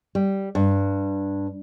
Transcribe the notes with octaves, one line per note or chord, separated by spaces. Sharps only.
G3
G2